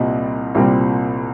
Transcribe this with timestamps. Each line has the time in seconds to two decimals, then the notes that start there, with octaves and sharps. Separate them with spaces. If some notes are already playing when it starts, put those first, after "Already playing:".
Already playing: C2 A#2 G3 C4 D#5
0.55 C2 A#2 G3 C4